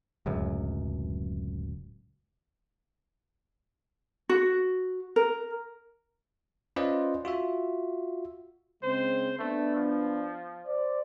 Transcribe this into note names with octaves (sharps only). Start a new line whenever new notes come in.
D1 C#2 F#2
F#4
A#4
C#4 F4 B4 C5 D5 D#5
F4 F#4 E5
C#3 G#3 C4 C5
A3 B3 D4
F3
C5 D5